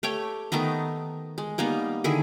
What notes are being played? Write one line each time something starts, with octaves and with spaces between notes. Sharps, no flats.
A3 G4 C#5 G5
D#3 A3 B3 D#4
G#3
G3 A#3 B3 D#4
D3 D#3 E4 G#4